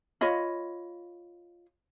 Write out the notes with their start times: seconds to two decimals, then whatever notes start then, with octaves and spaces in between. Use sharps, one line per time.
0.21 F4 C#5 D#5 B5